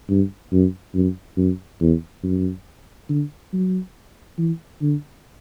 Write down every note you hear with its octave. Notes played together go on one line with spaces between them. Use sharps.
G2
F#2
F#2
F#2
E2
F#2
D3
F#3
E3
D3